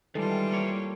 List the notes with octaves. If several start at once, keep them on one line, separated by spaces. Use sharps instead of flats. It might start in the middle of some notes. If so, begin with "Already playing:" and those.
D#3 E3 G3 G#3 F4 A4
A#3 C#5